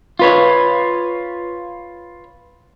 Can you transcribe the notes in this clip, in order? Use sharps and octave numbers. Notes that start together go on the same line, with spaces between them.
F4 B4 C#5